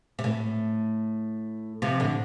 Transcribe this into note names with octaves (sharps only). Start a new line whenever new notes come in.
C3
A2
C3 F3
A2 D3